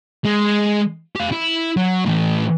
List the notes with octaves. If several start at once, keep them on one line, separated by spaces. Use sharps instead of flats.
G#3
G4 F5
E4
F#3
A2 E3